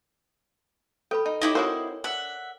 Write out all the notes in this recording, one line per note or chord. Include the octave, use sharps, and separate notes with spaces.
A4 B4 G5 B5
D#4
D#4 E4 G4 C#5 D#5 D6
C4 F#4 A#4 C5 C#5 G#5
D4 E5 F#5